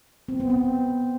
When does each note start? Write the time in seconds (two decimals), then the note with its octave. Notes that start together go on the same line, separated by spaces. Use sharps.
0.29 C4
0.40 B3
0.50 C4